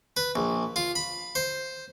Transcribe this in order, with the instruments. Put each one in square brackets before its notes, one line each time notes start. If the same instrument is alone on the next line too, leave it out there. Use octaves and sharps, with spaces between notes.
[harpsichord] B4
A#1
F4
B5
C5